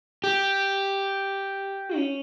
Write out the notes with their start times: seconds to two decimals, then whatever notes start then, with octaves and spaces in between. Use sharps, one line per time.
0.24 G4
1.96 C#4